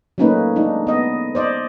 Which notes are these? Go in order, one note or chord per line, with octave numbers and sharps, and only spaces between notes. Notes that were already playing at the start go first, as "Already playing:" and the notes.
F#3 A3 A#3 C#4 D#4 B4
G#3 D4 D#4
B3 D#5
C5 D5 D#5